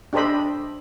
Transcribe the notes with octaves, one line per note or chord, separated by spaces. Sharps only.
D4 G4 A4 C5 D#5 B5